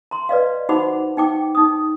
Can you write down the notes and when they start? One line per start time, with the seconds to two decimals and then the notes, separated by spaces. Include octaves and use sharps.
0.11 A#5 C6
0.29 B4 D5 D#5 F5
0.69 D#4 F#4 C5 F#5 B5 D6
1.17 D#4 G5 D6
1.55 D#4 D#6